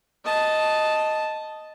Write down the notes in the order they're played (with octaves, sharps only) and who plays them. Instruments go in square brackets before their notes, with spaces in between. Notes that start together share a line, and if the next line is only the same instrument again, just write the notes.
[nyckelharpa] D#5 A5